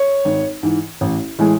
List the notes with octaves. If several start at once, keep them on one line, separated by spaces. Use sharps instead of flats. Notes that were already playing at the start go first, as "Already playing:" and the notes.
Already playing: C#5
G#1
G#2 E3
A1
A2 E3 G#3